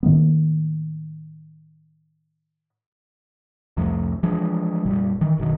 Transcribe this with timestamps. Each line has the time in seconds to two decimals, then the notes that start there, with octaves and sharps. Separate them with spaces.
0.03 A2 D#3 A#3 B3
3.77 C2 F2 F3 A3
4.23 E3 F3 G#3 D4
4.85 F1 A#2 G3
5.21 D#3 E3
5.38 F#1 B2 D#3